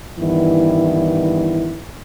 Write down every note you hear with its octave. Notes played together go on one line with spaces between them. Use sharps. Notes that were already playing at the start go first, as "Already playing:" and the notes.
G2 D#3 E3 B3 E4